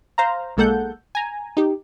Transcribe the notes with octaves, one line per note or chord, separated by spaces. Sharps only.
C5 F5 A#5
B1 G#3 A#3 A4 F#5 G6
G#5 A#5
D#4 G4